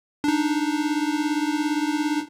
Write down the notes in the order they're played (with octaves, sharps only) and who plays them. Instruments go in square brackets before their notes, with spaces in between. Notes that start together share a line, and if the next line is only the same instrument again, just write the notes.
[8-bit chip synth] D4 D#4